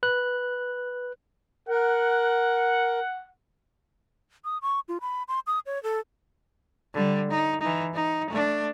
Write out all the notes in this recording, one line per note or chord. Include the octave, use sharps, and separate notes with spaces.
B4 F#6
A#4 F#5
D#6
C#6
F4
B5
C6
D#6
C#5
A4
D3 G3
D#4
E3 D#4
D#4
A3 D4